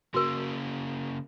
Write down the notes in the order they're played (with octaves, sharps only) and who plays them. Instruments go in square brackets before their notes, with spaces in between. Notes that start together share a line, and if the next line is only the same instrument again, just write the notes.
[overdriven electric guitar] C#3 A#3 [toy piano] F#4 A#4